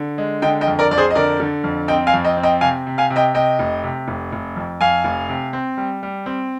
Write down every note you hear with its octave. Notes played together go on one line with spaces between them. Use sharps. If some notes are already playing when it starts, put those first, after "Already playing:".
Already playing: D3
G#3
D3 D#5 G5
D#5 G5
F2
A#4 D5
F2 D5
G#4 C5
D#5
D3 A#4 D5
D3
F2
C4 D#5 G5
F5 G#5
F2
D#5 G5
C4
D#5 G5
C3 F5 G#5
C3
F5 G#5
C3
D#5 G5
C3 D#5 G5
F1
C3
F1
F1
F2
F2 F5 G#5
F1
C3
C4
G3
G3
C4